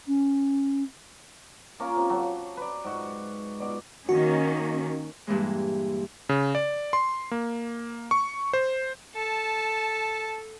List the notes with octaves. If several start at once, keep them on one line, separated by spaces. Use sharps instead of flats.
C#4
A#3 C#4 F4 A#4
C3
F#3 A5
B4 D5
G#2 F#4
B2 D5
D#3 A#3 C#4 F#4
G2 A#2 E3 G#3
C#3
D5
C6
A#3
C#6
C5
A4 A5